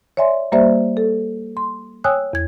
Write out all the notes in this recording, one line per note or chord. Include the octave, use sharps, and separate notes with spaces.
C#5 D5 E5 G#5 C6
G3 A#3 G4 C5 D5 E5
A4
C6
C#5 G5 G#5 D#6 E6 F#6
E2 G#6